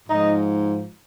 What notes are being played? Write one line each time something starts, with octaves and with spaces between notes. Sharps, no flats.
G#2 F3 D#4 D#5